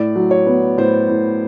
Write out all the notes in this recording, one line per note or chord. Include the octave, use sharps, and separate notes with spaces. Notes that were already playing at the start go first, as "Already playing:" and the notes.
Already playing: A2 D5
F#3
C#5
B3
A2 C5
A2